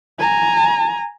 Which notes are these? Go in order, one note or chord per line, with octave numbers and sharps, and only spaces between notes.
G#5 A#5